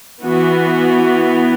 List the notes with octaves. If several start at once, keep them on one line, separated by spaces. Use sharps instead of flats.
E3 B3 F#4